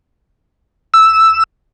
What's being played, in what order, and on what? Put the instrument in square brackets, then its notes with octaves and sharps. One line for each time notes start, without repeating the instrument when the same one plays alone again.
[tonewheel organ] E6